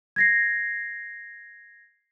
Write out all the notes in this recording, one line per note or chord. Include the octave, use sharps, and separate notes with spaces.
G#6 A#6 C7